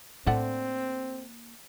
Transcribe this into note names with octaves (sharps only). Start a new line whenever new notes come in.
A2 D3 A3 A#3 C4 F#5